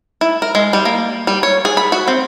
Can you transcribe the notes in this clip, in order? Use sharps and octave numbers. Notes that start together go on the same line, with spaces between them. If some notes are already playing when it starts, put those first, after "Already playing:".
E4
A#4
G#3
G3
A#3
G3
C#5
G#4
B5
F#4
C4